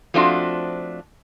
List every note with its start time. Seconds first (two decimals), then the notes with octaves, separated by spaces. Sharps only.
0.14 F3 A3 C4 D4 F4 F#4